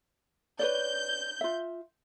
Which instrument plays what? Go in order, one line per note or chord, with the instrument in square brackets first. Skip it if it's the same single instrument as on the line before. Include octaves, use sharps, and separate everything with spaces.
[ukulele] B4 C#5 D5 [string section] G6
[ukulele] F4 E5